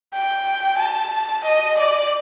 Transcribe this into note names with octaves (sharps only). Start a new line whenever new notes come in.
G5
A5
D#5
D5